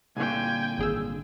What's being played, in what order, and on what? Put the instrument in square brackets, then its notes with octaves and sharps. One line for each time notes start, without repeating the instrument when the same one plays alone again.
[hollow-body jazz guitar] C2 A#2 D3 [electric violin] G5 G#5
[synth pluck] G#1 G#4 E6